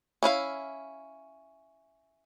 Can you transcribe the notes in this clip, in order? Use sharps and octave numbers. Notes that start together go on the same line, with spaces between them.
C#4 E4 F4 F5